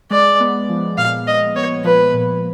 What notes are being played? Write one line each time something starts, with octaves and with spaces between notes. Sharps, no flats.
G#3 D5
B3
F3
A#2 F5
G#3 D#5
B3 C#5
F3 B4
A#2